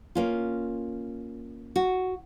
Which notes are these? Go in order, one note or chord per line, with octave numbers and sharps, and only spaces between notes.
A#3 C#4 F4
F#4